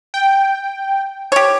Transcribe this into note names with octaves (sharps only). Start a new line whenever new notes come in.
G5
G4 C#5